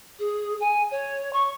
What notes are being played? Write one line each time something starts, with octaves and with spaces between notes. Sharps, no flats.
G#4
G#5
C#5
C#6